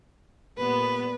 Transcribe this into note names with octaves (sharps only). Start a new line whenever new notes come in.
A#2 G3 B3 B4